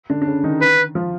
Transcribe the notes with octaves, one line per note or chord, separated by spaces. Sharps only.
D3 D4
D4
C#3 C#4
D#3 D#4
B4
F3 F4